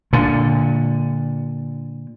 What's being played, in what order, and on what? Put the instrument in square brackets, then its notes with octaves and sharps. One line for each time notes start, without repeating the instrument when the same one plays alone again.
[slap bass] A#2 D3